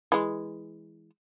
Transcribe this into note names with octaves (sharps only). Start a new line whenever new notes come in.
E3 G#3